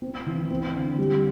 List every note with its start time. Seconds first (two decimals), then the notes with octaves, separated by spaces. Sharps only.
0.02 C4
0.26 E3
0.50 C4
0.74 D3
0.98 G3